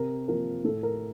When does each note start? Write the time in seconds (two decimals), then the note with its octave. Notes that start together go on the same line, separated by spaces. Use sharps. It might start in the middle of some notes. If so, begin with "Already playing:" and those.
Already playing: C3 A#4
0.28 F3 A#3 A#4
0.64 A2 A4
0.83 A#4